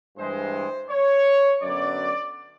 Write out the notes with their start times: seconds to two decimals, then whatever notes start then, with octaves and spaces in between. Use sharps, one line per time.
0.17 G2 E3 G#3 C5
0.89 C#5
1.62 F#2 D3 F#3 B3 D5